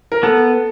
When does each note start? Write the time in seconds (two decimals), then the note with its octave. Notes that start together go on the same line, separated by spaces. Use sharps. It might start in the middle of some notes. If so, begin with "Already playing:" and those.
0.12 A#4
0.23 B3 A4